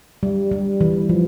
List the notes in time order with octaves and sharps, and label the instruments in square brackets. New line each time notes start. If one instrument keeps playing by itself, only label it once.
[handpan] G3
G3
E3
F3